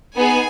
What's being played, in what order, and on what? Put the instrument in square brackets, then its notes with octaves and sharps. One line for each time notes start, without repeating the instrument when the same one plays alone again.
[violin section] B3 D#4 G#4 G#5